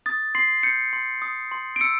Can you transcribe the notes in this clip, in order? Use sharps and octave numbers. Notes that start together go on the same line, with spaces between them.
D#6 A6
C6 C7
G6 C#7
C6
D#6
C6
D7
E6 C#7